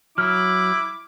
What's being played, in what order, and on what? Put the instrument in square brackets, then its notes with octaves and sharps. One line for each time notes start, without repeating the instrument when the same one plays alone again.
[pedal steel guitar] F#3 [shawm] E4 [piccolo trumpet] D6 [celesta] F6